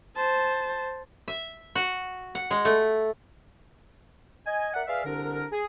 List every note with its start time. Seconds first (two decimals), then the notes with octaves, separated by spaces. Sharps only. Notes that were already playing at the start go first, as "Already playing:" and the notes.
0.16 C5 A5
1.28 E5
1.75 F#4
2.35 F#5
2.51 G#3
2.65 A3
4.46 D#5 G#5
4.74 A#4 D5 E5 F#5
4.87 G#4 B4 D5 E5 F5
5.05 C2 D3 D4 A#4
5.52 G#4